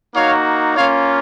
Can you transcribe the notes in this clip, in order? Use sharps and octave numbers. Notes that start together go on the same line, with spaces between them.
A#3 D#4 F#4 C#5 F5
A#3 C#4 F4 C#5 F5